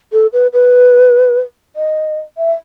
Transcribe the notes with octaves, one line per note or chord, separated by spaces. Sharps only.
A4
B4
B4
D#5
E5